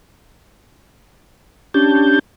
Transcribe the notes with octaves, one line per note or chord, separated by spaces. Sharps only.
C#4 D4 G4 A5 G6